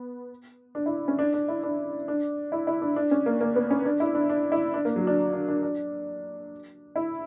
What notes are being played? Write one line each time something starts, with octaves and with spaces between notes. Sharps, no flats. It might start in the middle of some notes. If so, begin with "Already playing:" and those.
Already playing: B3
D4
E4
C#4
D4
D4
E4
D4
D4
E4
E4
D4
D4
C#4
A#3
A#3
B3
C#4
D4
E4
D4
D4
E4
D4
A#3
F#3
D4
D4
D4
D4
E4